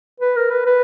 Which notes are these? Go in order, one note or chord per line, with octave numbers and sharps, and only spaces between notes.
B4
A#4
B4
B4